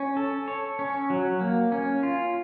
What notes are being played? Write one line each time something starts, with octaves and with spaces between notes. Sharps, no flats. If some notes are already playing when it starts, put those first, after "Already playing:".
Already playing: C#4
A4
C#5
C#4
F#3
A#3
C#4
F4